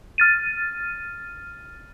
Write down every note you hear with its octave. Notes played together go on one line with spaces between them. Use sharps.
F6 A6 D#7